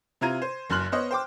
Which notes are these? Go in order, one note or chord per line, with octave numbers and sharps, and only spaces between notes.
C3 E4 F4 A#5 G#6 D#7
C5
F#1 F#2 C6 F6 F#6 F#7
B3 C5 C#5 D#5
C5 G5 D6